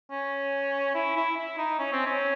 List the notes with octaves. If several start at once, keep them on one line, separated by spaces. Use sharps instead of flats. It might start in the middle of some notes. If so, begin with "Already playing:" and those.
C#4
E4
E4
E4
D#4
C#4
C4
C#4